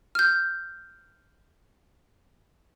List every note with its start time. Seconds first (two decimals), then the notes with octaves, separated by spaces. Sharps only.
0.15 F6 G6